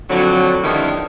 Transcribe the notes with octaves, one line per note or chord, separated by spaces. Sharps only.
F2 A2 D3 F#3
F2 D3 D#3 G3 B3 E4